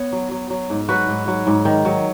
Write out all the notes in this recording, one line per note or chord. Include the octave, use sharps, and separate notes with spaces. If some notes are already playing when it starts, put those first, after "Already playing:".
Already playing: B3 C#5
F#3
F#3
F#3
G#2
F#3 F#4 B4
G#2
F#3
G#2
D#3
F#3